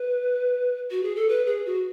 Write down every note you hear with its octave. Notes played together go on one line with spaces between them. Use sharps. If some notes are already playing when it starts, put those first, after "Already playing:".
Already playing: B4
F#4
G#4
A4
B4
G#4
F#4